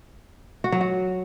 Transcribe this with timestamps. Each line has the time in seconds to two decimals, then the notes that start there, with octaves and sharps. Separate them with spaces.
0.64 F#4
0.72 F#3
0.81 F#4